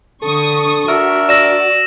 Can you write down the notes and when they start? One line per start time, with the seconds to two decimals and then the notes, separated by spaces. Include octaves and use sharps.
0.22 D3 A4 C#6 D#6
0.88 D4 F#4 A#4 E5
1.29 D5 E6 A#6 E7